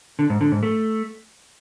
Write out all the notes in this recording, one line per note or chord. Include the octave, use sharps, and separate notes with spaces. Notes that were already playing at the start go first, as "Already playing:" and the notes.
D3
G#2
D3
G#2
A3